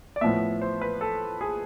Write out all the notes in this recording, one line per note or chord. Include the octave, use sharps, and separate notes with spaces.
D5
A2 F3 B3 E5
C5
B4
A4
G#4